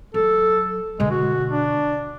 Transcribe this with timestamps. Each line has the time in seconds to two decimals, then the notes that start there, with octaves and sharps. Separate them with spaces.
0.14 F#3 A4
1.00 B2 D3 G#3
1.11 F#4
1.51 D4